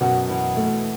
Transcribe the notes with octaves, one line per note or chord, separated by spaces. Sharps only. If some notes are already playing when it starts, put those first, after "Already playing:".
F#2 B2
E3
A3